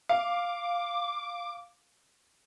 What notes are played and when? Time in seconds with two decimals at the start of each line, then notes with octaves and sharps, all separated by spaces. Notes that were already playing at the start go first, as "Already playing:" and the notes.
0.09 F5 D6